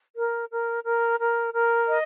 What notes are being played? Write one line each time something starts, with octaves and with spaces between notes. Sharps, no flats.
A#4
A#4
A#4
A#4
A#4
D#5